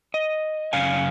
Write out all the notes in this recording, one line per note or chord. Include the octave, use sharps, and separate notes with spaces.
D#5
F#2 C#3 F5 G#5